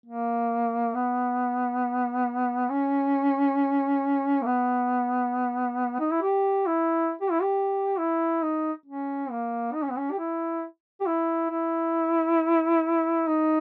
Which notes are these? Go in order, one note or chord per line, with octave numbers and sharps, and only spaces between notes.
A#3
B3
C#4
A#3
B3
D#4
E4
G4
E4
G4
E4
G4
E4
D#4
C#4
A#3
D#4
C#4
B3
C#4
G4
E4
G4
E4
E4
D#4